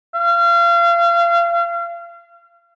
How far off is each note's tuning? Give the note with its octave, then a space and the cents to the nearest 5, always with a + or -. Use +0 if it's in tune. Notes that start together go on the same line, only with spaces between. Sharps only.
F5 -35